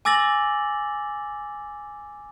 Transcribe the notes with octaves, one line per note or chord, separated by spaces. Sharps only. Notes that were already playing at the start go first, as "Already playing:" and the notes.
G#5 D6 E6 A6 A#6 F#7